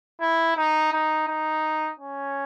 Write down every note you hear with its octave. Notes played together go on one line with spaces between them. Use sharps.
E4
D#4
D#4
D#4
C#4